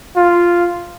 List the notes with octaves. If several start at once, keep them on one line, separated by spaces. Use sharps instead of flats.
F4